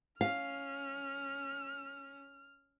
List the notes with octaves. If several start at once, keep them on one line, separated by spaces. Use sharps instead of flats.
C#4 F5 F6